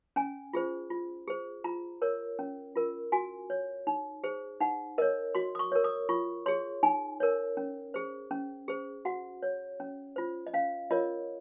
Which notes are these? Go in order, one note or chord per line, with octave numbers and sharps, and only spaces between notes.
C#4 G#5
F4 G#4 C5
F4
G#4 C5
F4 A#5
A#4 C#5
C#4
F4 A#4
F#4 G#5
C#5
D#4
G#4 C5
D#4 F#5
A#4 C#5 D#5
F#4 C6
D#6
C#6
A#4 C#5
D#6
F4 C#6
G#4 C#5 C6
D#4 G#5
A#4 C#5
C#4
G#4 C5
C#4
G#4 C5
F#4 F#5
C#5
C#4
F4 C5
D#5
C#4 F5
F4 A#4 C#5 D#5